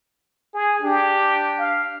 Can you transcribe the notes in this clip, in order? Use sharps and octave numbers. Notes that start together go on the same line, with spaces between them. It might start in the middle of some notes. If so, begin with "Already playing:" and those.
G#4
D4 G4
F5